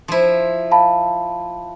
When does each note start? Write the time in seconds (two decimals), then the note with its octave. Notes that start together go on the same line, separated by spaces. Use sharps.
0.08 F3 E4
0.71 F5 A5 B5